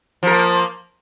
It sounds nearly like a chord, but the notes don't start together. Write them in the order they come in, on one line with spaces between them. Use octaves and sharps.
F3 A#4 A#3